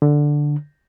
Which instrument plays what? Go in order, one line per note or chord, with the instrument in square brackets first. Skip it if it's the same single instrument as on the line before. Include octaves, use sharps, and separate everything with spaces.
[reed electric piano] D3